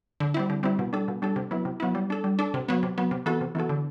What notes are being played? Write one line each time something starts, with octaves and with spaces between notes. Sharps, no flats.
D3
G3 C4 E4
D3
G3 C4 E4
B2
G3 D4 A4
B2
G3 D4 A4
C3
F#3 B3 E4
C3
F#3 B3 E4
G3
D4 A4
G3
D4 A4
C3
F#3 B3
C3
F#3 B3
C3
E3 B3 F#4 A4
C3
E3 B3 F#4 A4
D3